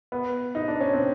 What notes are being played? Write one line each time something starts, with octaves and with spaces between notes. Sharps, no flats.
B3
D#4
D4
C#4
C4